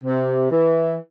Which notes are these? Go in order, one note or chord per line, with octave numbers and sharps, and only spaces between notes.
C3
E3